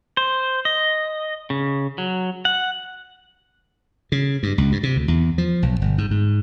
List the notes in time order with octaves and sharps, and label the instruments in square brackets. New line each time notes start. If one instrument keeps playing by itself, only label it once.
[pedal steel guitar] C5
D#5
C#3
F#3
F#5
[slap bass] C#3
G2
C#2
G2
C3
D2
E2
F3
B1
G1
G#2
G#2